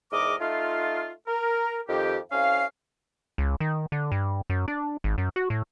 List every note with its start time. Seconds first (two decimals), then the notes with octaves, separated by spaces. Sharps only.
0.12 E2 G#2 A#4 D#5 D6
0.40 A3 D#4 F4
1.28 A#4
1.88 F2 D#3 G4
2.31 C2 C#4 F5
3.38 C#2
3.60 D#3
3.92 D3
4.12 G2
4.50 F#2
4.68 D4
5.04 G#1
5.18 F#2
5.36 F#4
5.50 A2